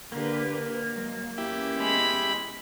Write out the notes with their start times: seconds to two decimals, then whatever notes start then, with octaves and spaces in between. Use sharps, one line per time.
0.12 D3 A#3 G4 B4
0.48 A#3
0.92 F#3 G#3
1.38 E2 C#4 E4 G4
1.79 G#3 B5